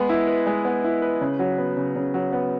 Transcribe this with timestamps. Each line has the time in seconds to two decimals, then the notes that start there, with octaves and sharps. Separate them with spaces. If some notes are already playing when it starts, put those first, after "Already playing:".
Already playing: G#3 B3
0.09 E4
0.27 B4
0.47 G#3
0.65 B3
0.84 E4
1.02 B4
1.21 C#3
1.39 F#3
1.58 B3
1.77 C#3
1.96 C#3
2.14 F#3
2.33 B3